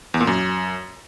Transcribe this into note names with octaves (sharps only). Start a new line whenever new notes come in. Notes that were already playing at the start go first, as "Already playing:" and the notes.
E2
A#2
F#2